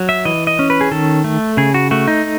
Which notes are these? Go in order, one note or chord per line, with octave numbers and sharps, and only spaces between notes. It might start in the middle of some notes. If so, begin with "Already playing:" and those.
Already playing: F#3
E5
E3 D#5
D#5
C#4
B4
G#4
D#3 A4
A3
C#3 G#4
F#4
A3 F#4
D#4